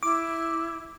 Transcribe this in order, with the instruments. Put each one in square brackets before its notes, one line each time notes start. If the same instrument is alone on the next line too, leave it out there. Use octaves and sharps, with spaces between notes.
[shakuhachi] E4 [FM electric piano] D6